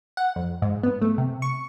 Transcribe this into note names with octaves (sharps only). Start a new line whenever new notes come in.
F#5
F2
G#2
B3
A3
C3
C#6